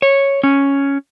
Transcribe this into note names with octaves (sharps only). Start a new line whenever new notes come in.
C#5
C#4